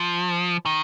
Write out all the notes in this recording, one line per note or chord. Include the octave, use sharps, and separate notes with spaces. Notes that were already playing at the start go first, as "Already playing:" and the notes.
Already playing: F3
D#3